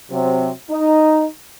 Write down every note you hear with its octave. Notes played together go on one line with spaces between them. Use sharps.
C3 F#3 C4
D#4